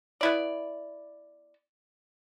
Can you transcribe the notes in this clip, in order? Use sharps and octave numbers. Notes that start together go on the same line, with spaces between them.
B3 E4 D5